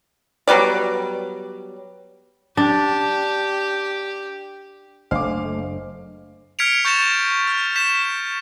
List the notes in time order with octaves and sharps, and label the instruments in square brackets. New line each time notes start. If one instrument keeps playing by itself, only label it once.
[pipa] F#3 G3 B3 D5
[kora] D4 [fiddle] G4
[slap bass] F#1 D4 [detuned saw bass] A3 [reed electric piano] C5 D#5 G#5 [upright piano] F5 D6
[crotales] F6 G#6 B6 C#7 D7 F7
C#6 G6 A6 A#6 E7 F7
F6
G6 B6 E7